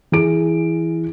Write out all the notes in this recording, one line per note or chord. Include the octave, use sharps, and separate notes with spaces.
E3 G#4 D7